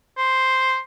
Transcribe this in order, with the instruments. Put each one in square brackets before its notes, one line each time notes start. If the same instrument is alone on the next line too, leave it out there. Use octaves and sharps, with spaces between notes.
[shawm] C5